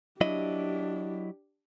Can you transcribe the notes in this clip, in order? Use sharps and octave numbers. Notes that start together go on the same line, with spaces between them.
F#3 D4 E4 G4 D#5